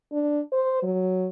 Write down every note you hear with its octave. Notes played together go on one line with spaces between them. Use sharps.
D4
C5
F#3